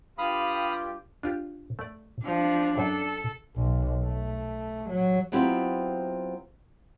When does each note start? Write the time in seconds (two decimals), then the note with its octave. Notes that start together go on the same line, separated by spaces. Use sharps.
0.18 G2 F4 G4 F5 B5 D#6
1.23 D4 F4 G4
1.79 A3 D5
2.25 F3 D4 F5
2.78 F#2 A4 G5
3.56 B1
4.05 A3
4.90 F#3
5.32 F#3 B3 C4 E4 F4 G4